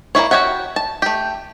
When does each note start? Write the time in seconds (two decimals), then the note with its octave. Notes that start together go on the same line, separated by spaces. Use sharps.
0.15 A#3 C#4 E4 C#5
0.31 F#4 G4 C#5 E5 F#5
0.76 A5
1.02 A3 G4